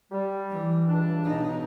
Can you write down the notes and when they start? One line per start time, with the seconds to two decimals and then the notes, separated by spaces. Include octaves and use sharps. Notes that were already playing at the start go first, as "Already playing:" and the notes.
0.12 G3
0.50 E3
0.87 C#2 G2 D4
1.25 B2 D#4